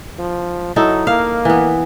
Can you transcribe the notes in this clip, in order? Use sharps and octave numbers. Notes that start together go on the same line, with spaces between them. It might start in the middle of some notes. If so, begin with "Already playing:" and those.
F3
F#3 D#4 E4 A4
A#3 F5
E3 B3